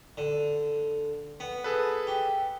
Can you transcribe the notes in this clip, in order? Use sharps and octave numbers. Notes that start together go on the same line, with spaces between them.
D3
B3
G#4 A4 B4
G4